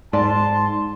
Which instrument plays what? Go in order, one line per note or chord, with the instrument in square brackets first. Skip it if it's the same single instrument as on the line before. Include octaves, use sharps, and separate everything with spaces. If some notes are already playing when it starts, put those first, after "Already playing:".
[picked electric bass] G#2 [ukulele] D5 [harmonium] A5 [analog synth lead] C6